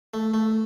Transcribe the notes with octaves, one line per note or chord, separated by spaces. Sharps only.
A3
A3